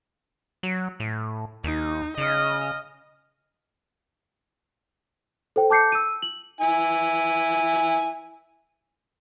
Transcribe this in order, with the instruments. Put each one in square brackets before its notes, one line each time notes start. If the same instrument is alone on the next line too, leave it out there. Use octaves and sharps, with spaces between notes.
[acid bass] F#3
A2
[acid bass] D#2 [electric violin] D#4
[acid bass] C#3 [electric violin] D#5 F6
[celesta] A4 C5 G5
A5 D6 G6 C7 C#7
E6 D#7
F#7
[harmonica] E4 G#5